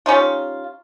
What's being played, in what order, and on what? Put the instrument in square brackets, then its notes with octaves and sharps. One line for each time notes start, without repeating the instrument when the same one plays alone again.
[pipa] G3 C#4 D#4 F4